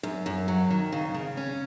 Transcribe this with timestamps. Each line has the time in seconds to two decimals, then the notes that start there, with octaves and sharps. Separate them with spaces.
0.03 F#2
0.26 F#2
0.48 F#3
0.70 D#3
0.92 C#3
1.14 C#3
1.37 C#4